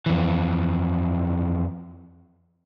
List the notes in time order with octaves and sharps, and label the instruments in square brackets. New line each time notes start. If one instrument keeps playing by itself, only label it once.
[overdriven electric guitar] F2 E3